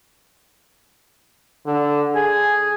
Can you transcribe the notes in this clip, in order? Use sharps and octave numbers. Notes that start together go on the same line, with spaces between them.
D3
G#4 G#5